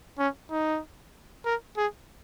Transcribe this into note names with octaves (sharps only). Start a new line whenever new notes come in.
C#4
D#4
A#4
G#4